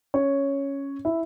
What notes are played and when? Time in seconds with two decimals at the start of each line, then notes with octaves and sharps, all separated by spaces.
0.14 C#4 C#5
1.05 E4 E5